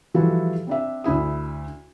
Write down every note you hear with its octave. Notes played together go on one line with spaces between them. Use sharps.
E3 F3 G3 E4 F#4 A4
C4 D4 E5
D2 D3 E4 D#6